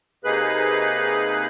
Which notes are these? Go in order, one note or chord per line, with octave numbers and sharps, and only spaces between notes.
C3 A#3 D#4 G#4 B4 F#6